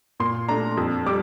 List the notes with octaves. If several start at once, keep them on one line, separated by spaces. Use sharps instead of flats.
A#2 C6
A3 D4 A#5
F2
G3 D6